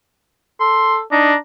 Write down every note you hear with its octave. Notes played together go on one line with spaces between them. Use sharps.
A4 C6
D4 D#4 A#5